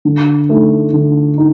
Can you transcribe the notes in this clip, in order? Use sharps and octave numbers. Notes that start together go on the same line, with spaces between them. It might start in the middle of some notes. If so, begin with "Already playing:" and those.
D3
A3 D#4
D3
D#4